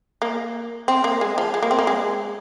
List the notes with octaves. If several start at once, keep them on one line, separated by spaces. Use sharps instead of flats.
A#3
C4
A#3
G#3
F3
G#3
A#3
C4
A#3
G#3